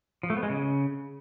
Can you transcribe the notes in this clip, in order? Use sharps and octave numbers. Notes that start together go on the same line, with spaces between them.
F3
A3
B3
G#3
C#3